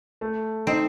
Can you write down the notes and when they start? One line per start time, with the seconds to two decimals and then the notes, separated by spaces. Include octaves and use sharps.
0.21 A3
0.67 C4 D#4